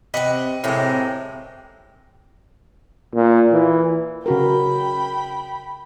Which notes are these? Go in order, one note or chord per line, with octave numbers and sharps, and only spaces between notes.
C3 C4 B4 D#5 F#5
A2 C3 G#3 A#3 C4
A#2
E3
C#3 F#4 A#4 G5 B5